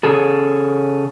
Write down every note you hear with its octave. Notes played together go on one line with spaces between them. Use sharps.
C#3 G#4 A4